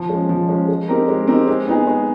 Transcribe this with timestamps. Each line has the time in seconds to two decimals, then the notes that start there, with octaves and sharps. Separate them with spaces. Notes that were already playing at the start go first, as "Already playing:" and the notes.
Already playing: F3
0.09 G#3 C#4
0.29 F3
0.49 G#3 C#4
0.68 G#3
0.88 C4 D#4 G4 A#4
1.08 G#3
1.27 C4 D#4 G4 A#4
1.47 G#3
1.67 B3 D#4 G#4
1.87 G#3